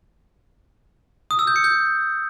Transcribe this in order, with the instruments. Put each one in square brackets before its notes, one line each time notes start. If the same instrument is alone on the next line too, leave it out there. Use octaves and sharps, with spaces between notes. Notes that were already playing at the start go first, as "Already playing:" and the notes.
[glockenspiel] D#6
E6
G6
C#7
G6